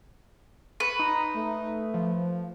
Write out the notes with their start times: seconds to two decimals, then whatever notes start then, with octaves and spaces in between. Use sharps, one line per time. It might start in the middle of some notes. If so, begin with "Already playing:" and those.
0.80 B4 C#6
0.99 D#4 A#5
1.35 A3
1.94 F3